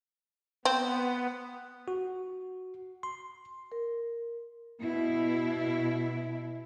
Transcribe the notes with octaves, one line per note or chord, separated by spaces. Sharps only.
B3 C4
F#4
C6
A#4
B2 E4